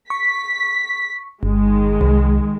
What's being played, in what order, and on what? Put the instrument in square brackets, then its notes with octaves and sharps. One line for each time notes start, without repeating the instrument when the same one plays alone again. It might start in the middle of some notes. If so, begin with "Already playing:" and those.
[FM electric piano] C#6 [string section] B6
[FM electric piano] G1 [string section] D#3 G#3
[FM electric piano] C2